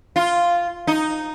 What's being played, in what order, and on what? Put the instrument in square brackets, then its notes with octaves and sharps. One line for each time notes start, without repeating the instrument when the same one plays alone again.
[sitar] F4
D#4